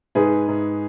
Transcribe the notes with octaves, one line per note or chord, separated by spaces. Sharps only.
G#2 G#4 B4
G#2